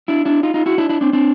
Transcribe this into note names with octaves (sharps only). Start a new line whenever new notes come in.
D4 E4
D4 E4
D#4 F4
D#4 F4
E4 F#4
D4 E4
D4 E4
C4 D4
C4 D4